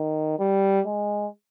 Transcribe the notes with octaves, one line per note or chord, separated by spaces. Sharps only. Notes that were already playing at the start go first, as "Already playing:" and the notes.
Already playing: D#3
G3
G#3